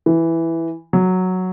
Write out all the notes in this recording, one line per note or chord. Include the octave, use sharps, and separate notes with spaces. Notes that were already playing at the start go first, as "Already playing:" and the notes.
E3
F#3